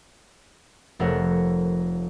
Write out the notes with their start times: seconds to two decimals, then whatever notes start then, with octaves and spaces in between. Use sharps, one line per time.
0.99 F1 A3 A#4 C#5 F#5